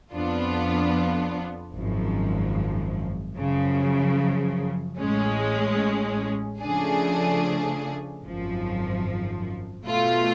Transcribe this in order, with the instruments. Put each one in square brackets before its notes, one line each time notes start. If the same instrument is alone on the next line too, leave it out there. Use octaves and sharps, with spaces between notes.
[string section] F2 F3 B3 D4 F4
G#1 F#2 F3
F#2 C#3 F3
A1 A2 G#3 C#4
C#3 F3 A3 D4 G#4
G#1 F#2 F3
B2 A3 F4